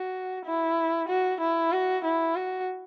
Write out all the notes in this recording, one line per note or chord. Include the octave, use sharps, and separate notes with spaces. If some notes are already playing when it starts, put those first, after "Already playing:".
Already playing: F#4
E4
F#4
E4
F#4
E4
F#4